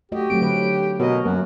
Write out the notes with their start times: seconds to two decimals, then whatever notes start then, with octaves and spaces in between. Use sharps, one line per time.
0.12 A3 F#4 G4 D#5
0.30 F#3 A3 C4 D7
0.42 D3 F#3 G4 B4
1.00 B2 F#4 A#4 C#5 D#5
1.25 F#2 A#3 F#4